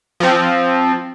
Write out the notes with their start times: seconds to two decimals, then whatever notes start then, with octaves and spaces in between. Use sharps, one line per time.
0.20 F3 C4